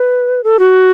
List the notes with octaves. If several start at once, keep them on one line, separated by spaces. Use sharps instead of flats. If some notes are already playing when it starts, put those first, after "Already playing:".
Already playing: B4
A4
F#4